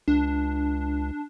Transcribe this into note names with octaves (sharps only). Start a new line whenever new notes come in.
C#2 D4